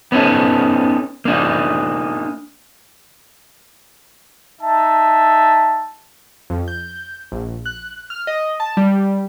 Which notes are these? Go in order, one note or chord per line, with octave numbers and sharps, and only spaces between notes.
B3 C#4 D#4 A4
A#3 D4 D#4
D#4 E5 A5
F2
G6
A#1
F#6
F6
D#5
A5
G3